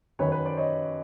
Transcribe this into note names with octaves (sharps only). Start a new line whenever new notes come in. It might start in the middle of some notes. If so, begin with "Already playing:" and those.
F#2 D#3 F#3 B4 C#5
B4 C#5
C5 D5
C#5 D#5